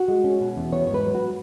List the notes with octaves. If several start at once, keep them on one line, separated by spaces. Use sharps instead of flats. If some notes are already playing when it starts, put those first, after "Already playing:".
Already playing: F#4
G#3
C#4
B2
E2
B3 C#5
G#2 C#5
B4
F#3
F#4